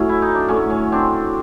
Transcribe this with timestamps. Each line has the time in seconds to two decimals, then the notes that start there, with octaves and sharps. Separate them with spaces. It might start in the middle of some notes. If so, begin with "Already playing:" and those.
Already playing: A2 F#3 C#4
0.09 E4
0.22 D#4
0.35 D4
0.48 A2 F#3 C#4
0.70 C#4
0.92 C4 D4